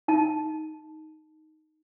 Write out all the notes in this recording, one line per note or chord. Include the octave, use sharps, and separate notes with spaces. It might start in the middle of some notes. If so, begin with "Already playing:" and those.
D#4 A5